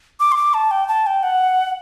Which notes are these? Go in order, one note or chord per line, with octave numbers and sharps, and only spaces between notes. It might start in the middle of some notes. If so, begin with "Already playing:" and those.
D6
C6
D6
A5
G5
A5
G5
F#5